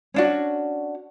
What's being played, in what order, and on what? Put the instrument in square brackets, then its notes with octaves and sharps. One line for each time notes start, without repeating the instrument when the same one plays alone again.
[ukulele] C#4 D4 F#4